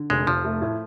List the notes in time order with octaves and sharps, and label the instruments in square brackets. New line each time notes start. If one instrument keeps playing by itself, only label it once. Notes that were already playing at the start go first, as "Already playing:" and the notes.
Already playing: [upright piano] D3
[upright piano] F1 [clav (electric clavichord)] G#3
[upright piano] F1 [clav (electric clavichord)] F3
[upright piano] A3
A2